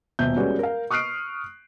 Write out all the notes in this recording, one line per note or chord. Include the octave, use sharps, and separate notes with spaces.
D#1 B2 E5 G6
G3 G#3 C#4 F#4 B4 D5
A#4 F5
C#6 D#6 F6 F#6 C7 D7